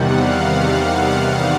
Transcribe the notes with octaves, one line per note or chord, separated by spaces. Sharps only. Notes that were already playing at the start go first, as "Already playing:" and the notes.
Already playing: E2 C3 D#3 G3 F#5
F5